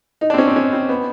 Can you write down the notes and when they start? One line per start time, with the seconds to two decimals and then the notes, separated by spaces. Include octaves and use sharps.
0.21 D#4
0.30 D4
0.34 C4
0.38 C#4
0.48 C4
0.56 C#4
0.73 C4
0.89 B3